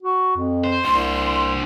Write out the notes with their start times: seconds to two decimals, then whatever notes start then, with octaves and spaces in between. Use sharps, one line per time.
0.03 F#4
0.37 F2
0.64 C5
0.85 C2 D4 C5 C6